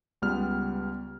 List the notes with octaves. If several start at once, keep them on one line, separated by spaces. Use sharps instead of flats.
C#2 G3 B3 F6